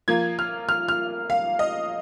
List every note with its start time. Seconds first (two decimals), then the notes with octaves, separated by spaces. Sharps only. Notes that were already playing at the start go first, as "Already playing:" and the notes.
0.08 F3 A#3 F4 G#6
0.39 F6
0.69 F6
0.89 F6
1.30 F5
1.59 D#5